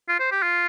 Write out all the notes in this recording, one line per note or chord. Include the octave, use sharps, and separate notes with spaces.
F4
C5
G4
F4